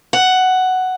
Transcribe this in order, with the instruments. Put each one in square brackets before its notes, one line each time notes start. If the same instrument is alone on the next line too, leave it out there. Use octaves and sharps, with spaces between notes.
[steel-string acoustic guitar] F#5